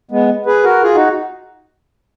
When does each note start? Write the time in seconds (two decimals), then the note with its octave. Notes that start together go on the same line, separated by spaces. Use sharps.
0.11 G#3 B3
0.46 G#4 B4
0.64 F#4 A#4
0.82 F4 G#4
0.95 D#4 F#4